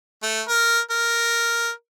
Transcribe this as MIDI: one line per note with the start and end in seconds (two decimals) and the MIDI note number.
0.23 0.42 57
0.49 0.79 70
0.91 1.71 70